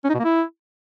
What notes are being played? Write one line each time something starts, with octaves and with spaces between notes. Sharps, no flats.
C#4
D#4
B2
A#3
E4